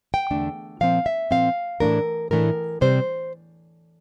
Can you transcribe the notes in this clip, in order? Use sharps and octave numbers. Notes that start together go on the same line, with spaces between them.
G5
E2 D3 A3 D4
A#2 F3 C4 F5
E5
A#2 F3 C4 F5
A2 E3 A3 D4 A#4
A2 E3 A3 D4 A#4
C3 G3 C4 C5